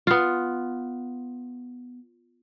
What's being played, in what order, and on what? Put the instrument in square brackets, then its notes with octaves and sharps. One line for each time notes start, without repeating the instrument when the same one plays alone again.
[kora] B3 F4